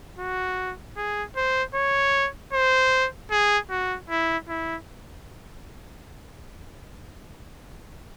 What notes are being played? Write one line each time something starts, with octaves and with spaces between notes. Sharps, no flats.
F#4
G#4
C5
C#5
C5
G#4
F#4
E4
E4